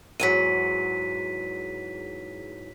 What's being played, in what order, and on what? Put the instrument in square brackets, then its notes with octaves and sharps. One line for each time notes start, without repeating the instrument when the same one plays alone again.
[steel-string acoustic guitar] E2 G#2 F#3 [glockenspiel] B6 D#7